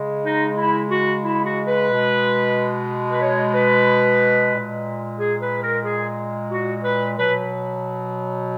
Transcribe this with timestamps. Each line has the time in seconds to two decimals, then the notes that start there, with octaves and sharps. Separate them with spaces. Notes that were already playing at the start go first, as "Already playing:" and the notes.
Already playing: C#3 G#3
0.26 D#4
0.58 E4
0.91 F#4
1.24 E4
1.45 F#4
1.68 B4
1.90 B2 G#3
3.12 B4
3.22 C#5
3.55 B4
4.53 A#2
4.58 G#3
5.19 G#4
5.42 B4
5.63 A#4
5.85 G#4
6.51 F#4
6.85 B4
7.17 B2 F#3 B4